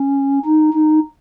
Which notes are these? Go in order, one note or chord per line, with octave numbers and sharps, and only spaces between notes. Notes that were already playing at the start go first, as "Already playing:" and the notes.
Already playing: C#4
D#4
D#4